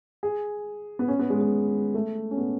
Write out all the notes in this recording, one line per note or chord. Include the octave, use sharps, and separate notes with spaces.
G#4
B3
C#4
B3
G#3
G#3
A3
C#4
B3